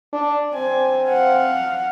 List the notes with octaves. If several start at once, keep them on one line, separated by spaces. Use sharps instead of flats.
D4
C4 G#5
F5 F#5